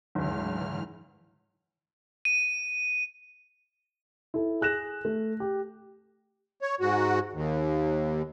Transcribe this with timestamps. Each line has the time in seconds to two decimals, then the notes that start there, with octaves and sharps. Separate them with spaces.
0.15 F#1 D2 G#2 E3 F6
2.25 D#7
4.34 E4 A4
4.61 G#4 F#6 A#6 E7
5.05 A3
5.40 G4
6.61 C#5
6.80 G#2 F#4
7.33 D#2